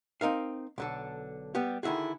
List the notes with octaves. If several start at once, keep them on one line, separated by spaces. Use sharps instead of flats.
C4 D#4 A#4 F5
B1 D3 A4
G3 B3 G4
D3 D#3 E4 F#4 G#4